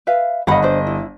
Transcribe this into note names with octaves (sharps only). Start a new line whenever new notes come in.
B4 E5 F5
G1 D#5 F5 F#5 B5
D4 C5
E4